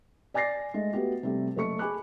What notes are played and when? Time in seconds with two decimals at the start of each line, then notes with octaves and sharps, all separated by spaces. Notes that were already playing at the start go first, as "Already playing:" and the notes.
0.34 D5 G#5 D6 A6 A#6 C7
0.74 G#3 A3
0.93 A3 B3 F#4 G4
1.23 C3 G3 A3
1.56 F#1 A3 A4 C#6 C#7
1.79 G#4 A4 G#5 B5 D6 F#6